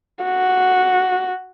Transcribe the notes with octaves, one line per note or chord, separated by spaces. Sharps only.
F#4